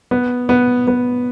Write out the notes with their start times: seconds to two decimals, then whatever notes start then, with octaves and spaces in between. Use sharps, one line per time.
0.11 B3
0.49 B3
0.87 B3